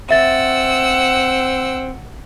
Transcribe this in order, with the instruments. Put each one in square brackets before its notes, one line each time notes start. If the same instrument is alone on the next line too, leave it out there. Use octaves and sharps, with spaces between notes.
[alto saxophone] C4 [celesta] E5 A6 [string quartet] F#5 E6